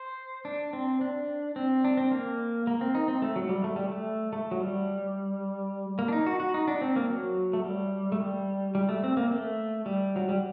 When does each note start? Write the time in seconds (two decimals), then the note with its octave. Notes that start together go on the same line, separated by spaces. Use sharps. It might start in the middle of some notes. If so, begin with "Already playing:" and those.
Already playing: C5
0.45 D4
0.73 C4
1.01 D4
1.56 C4
1.84 D4
1.97 C4
2.11 A#3
2.67 A#3
2.81 C4
2.95 D#4
3.08 C4
3.22 A3
3.36 F#3
3.49 G3
3.64 A3
3.76 G3
3.89 A3
4.33 A3
4.51 F#3
4.61 G3
5.99 A#3
6.08 D4
6.12 D#4
6.27 F#4
6.40 F#4
6.54 D#4
6.68 D4
6.81 C4
6.96 A#3
7.09 F#3
7.53 A3
7.65 G3
8.12 A3
8.20 G3
8.75 G3
8.89 A3
9.04 C4
9.17 A#3
9.31 A3
9.86 G3
10.16 F#3
10.29 G3